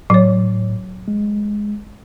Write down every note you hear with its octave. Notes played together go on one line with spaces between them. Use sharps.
A2 F#3 C#5
G#3